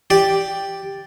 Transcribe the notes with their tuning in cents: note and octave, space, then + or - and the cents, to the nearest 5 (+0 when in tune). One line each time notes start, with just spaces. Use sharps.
G4 +0 D5 +0